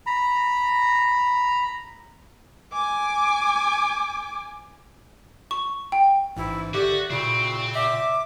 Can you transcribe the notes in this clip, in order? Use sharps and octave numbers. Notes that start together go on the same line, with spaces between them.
A#5 B5
G#5 D6
C#6
G5
A1 G#2 E4
D3 F#4 G4 D5 E5 F#6
A#2 C#3 C4 E4 F#4
E5 D6